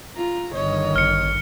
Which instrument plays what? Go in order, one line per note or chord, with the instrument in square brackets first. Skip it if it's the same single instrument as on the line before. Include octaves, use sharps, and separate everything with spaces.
[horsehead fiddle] F4 A#5
[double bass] G1 D#3 [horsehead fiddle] C#5 D#5
[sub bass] A1 [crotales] F6 C#7